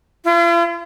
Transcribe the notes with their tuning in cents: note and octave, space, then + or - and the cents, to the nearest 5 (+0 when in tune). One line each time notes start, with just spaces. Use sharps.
F4 -45